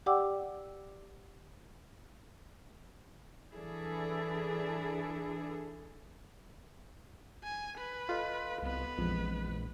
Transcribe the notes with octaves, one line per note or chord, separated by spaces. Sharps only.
G4 D5 F#5 G5 D6 E6
E3 D4 E4 G#4 A4
G#5
B4
F4 A4 D#5
C2 B3 B4
A#1 F2 E3 F3 G#3